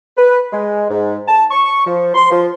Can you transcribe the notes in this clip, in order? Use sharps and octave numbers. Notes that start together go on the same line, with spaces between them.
B4
G#3
G#2
A5
C#6
F3
C6
F3